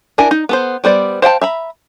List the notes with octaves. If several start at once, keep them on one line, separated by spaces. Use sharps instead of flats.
D4 E4 A#4 G#5
D#4
B3 A4 C5
G3 B3 C5 D5
C5 F5 G5 A5
E5 A#5 B5